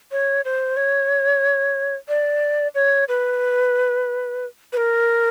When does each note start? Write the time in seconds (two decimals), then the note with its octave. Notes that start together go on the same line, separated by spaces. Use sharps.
0.12 C#5
0.45 C5
0.77 C#5
2.08 D5
2.75 C#5
3.08 B4
4.73 B4
4.77 A#4